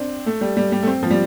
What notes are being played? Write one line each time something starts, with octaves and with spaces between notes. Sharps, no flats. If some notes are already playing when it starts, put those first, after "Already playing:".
Already playing: C4 D4
A3
G3
G3
G3
A3
C4
F3
G3